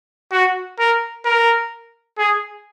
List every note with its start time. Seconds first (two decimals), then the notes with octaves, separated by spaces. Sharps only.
0.32 F#4
0.79 A#4
1.25 A#4
2.18 G#4